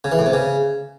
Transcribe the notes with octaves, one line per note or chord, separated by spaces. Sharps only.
C#3
E3
A2
C3
C#3